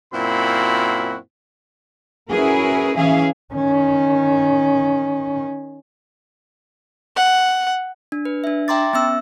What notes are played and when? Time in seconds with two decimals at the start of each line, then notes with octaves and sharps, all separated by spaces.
0.13 F#2 A#2 C4 E4 F#4 B5
2.30 C#4 E4 F#4 G#4 A#4 B4
2.97 E3 C#4 G#4 E5 F5
3.54 D#3 C#4
7.16 F#5
8.12 D4
8.25 B4
8.44 D4 E5
8.68 E5 G5 A#5 C6 D6 A6
8.93 B3 C#4 E5 E6